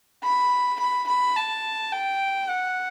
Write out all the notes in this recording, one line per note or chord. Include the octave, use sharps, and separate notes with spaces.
B5
B5
B5
A5
G5
F#5